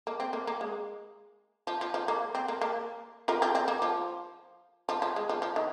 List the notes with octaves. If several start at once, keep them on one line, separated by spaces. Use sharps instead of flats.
A#3
C4
A#3
A#3
G#3
F3
F3
F3
A#3
C4
A#3
A#3
F4 A#4
C4 F4
C4
A#3
F3
F3
F3
G#3
F3
F3
D#3